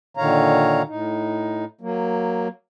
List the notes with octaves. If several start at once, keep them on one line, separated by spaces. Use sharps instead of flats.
A#2 D3 D#3 C#5 F5 A#5
A2 D#4
F#3 A#3